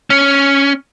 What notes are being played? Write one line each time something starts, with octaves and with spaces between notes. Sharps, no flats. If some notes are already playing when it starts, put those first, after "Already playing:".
C#4